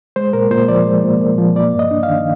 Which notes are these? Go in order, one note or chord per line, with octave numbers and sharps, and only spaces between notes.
G#3 C5
A#2 A#4
A#2 C5
F3 D5
G#3
A#2
A#2
F3
A#3 D5
G2
D#5
D4
F5
D#3